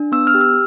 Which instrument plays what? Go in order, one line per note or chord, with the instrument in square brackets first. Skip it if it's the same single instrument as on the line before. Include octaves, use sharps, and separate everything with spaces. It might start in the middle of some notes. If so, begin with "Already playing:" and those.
Already playing: [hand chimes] D4
B3 E6
F6
G4
E6